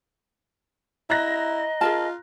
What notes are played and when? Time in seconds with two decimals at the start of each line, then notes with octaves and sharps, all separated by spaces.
1.10 E4 D#5 A#5 F#6 A#6
1.81 F4 G#4 A#4 A5